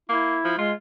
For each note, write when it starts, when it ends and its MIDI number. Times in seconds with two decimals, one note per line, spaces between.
0.09 0.37 58
0.09 0.53 64
0.44 0.58 53
0.58 0.73 56
0.58 0.71 65